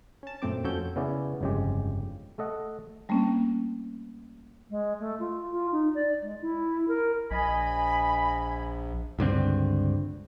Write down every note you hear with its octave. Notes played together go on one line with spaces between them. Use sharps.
C#4 A5
F#2 A#2 A3 C4 D6
F2 C4 C#4 F#4 A4 G6
C#3 B3 C#4 E4 D5
G1 F2 C#3 G#3 G4
A3 A4 D#5 F#5
G3 A3 A#3 C4 C#4
G#3
A3
F4
F4
D#4
D5
G#3
E4
A#4
A#1 D#5 G#5 B5
C#2 G2 D3 C4